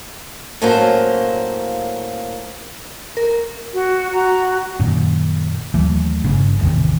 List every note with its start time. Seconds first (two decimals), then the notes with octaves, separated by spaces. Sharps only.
0.62 A2 F#3 A#3 C#4 F4 C5
3.17 A#4
3.74 F#4
4.13 F#4 A#5
4.79 F#2 A#2 D#3
5.74 D#2 E3 F#3 A3
6.24 G1 C#3
6.60 A1 E2 C3 D#3